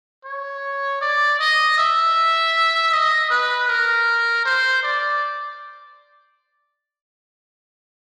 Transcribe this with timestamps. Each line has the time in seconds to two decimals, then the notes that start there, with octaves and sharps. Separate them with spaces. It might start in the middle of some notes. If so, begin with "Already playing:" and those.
0.24 C#5
1.01 D5
1.39 D#5
1.78 E5
2.92 D#5
3.30 B4
3.68 A#4
4.45 C5
4.83 D5